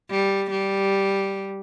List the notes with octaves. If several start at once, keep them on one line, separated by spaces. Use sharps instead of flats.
G3
G3